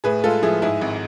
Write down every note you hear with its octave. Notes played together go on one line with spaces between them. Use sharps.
A2 G#4 B4
G#3 F4 A4
F3 E4 G#4
G#2 E4 G#4
G#1